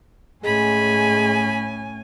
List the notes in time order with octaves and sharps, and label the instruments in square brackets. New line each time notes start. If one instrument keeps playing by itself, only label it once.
[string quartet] A2 C#4 G#5 [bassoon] G#3 [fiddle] B5